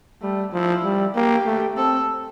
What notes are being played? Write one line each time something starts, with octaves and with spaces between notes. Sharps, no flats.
G3 A3
F3 E4
G3
A#3 G4
A3
C4 A4